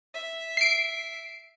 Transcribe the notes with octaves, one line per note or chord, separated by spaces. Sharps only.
E5
C7 D7